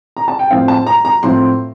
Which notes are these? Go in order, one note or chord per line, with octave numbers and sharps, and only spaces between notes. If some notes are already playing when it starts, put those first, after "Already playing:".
A#5
A5
G5
A2 F3 C4 F5
A5
A#5
A#5
A2 F3 C4 C6